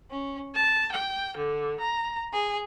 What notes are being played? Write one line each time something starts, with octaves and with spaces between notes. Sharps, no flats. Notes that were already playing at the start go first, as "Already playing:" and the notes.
C#4
A5
G5
D3
A#5
G#4